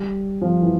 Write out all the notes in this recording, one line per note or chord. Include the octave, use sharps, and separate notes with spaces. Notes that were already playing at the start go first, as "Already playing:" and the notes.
Already playing: G3
F3
E3